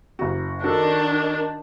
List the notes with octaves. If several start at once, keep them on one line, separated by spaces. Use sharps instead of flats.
F#1 F#4
D#3 D4 F#4 A4 A#4